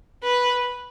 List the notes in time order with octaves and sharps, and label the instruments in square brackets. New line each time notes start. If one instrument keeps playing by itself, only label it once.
[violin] B4